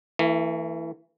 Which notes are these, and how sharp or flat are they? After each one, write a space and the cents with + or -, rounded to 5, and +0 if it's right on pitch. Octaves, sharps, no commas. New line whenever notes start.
E3 +0 A3 +45